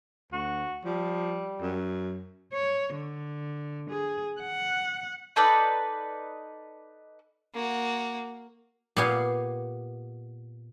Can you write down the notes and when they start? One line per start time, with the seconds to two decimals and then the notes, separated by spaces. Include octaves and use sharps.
0.32 D2 F#4
0.85 F3 G3
1.62 F#2
2.53 C#5
2.95 D3
3.90 G#4
4.40 F#5
5.36 D#4 A4 B4 D5
7.54 A#3 F#4
8.96 A#2 B3 G4 F5 G#5